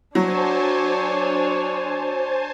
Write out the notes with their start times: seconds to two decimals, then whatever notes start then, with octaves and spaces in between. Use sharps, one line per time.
0.15 F#3 D4 C5 C#5 G#5 A5